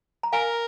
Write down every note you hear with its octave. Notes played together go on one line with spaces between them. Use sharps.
A#5
A#4 F5 G#5